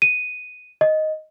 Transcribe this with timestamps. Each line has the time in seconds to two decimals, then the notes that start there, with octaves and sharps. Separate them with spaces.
0.02 D#7
0.81 D#5